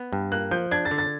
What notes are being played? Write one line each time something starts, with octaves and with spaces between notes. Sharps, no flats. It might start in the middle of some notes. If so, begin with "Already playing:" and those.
Already playing: B3
G2
A#3 F#6
F3 G6
D4 G#6
A6
D3
A6